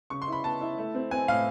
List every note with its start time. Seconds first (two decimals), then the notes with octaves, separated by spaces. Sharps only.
0.10 C#3 C#6
0.22 C6
0.28 E4 B5
0.44 B3 A5
0.61 E4
0.78 A3
0.95 C4
1.11 C4 G#5
1.28 A2 F5